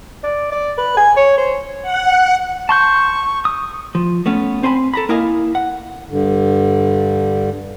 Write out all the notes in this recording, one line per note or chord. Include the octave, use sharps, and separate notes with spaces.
D5
D5
B4
G#5
C#5
C5
F#5
A5 C6 C#6 G6
D#6
F3
A3 B3 C#4
C4 C5 G#5 A#5 B5
A4 A#5 B5
A#3 E4 A#4 D#5 F5 G#5
F#5
G2 D3